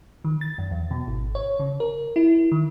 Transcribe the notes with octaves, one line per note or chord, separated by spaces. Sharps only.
D#3
A6
F#2
E2
B2
G#1
C#5
C#3
A#4
E4
D#3